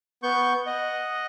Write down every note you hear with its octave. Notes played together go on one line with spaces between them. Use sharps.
B3 C#6 G6
D#5 F#5